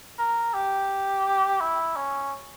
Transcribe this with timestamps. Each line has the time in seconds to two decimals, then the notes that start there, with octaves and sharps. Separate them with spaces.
0.19 A#4
0.54 G4
1.60 E4
1.96 C#4